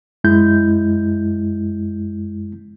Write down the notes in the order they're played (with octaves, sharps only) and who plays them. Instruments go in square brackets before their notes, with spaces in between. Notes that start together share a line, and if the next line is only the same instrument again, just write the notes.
[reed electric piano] F#2 G#3 E4 G6